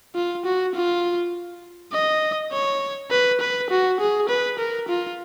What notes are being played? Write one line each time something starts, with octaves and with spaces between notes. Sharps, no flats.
F4
F#4
F4
D#5
C#5
B4
B4
F#4
G#4
B4
A#4
F4